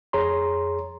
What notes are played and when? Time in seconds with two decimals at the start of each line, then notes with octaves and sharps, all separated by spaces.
0.13 F2 G#4 C#5 A#5 C6